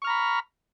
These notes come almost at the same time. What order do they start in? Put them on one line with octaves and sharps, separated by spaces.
C#6 F6 A#5 B5